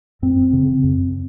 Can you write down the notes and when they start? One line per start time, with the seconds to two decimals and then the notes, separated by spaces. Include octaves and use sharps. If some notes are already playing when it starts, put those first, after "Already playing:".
0.22 F#2 C4
0.53 C#3
0.84 F#2